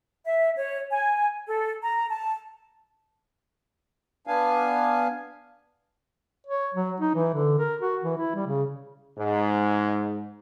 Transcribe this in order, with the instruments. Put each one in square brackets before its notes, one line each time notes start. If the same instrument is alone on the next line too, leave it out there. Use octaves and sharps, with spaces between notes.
[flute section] E5
C#5
G#5
A4
A#5
A5
[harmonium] B3 D4 F5 G#5
[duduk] C#5
F#3
D#4
E3
D3
A#4
F#4
E3
E4
G3
C#3
[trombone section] G#2